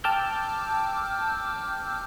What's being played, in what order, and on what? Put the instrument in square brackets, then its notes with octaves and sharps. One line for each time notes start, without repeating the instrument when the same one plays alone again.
[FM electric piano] G5 A5 D6 E6 F6 G6